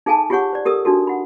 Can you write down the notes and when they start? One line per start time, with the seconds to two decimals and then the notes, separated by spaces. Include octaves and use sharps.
0.06 D#4 G#4 A4 F5 G#5 A5
0.30 F4 G4 G#4 C#5 F#5 C#6
0.53 C5 D5
0.65 G4 A4 A#4 D#6
0.85 D4 D#4 F#4 A4
1.07 F#5 B5